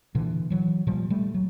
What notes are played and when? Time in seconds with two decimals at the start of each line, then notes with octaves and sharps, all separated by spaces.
0.15 A#2 D3 E3
0.50 E3 F#3
0.87 A#2 F3 G3
1.10 G3 A3
1.34 F#3